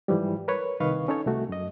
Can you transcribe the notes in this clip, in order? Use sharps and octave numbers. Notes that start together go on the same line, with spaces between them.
G#2 E3 F3 G3
A#4 B4 C#5
C2 D#3 B4 D#5 F5 C#6
C#4 D#4 A4 C#5
C2 A3 F#4
F#2 D#5